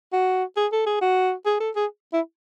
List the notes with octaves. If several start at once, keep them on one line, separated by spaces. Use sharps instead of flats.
F#4
G#4
A4
G#4
F#4
G#4
A4
G#4
E4